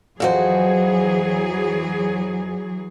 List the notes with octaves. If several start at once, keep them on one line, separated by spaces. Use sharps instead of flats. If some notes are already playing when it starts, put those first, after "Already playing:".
F2 E3 F#3 F#4 G#4 C5